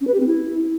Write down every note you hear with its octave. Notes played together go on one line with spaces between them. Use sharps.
C#4
B4
G4
C4
E4